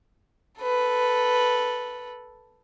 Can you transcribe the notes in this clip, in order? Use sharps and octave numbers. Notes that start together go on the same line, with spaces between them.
A4 B4